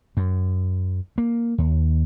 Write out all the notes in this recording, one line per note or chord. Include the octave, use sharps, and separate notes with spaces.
F#2
A#3
D#2